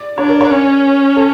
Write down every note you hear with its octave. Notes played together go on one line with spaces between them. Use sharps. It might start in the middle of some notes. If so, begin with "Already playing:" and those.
Already playing: D5
D4 C#5
A#4
C#5
C#4
A4